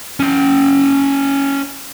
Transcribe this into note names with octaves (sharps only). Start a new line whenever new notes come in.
C#4 G5